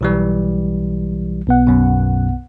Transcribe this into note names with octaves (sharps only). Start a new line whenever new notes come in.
B1 E3 G3
B1 B3 F#5
F#2 B2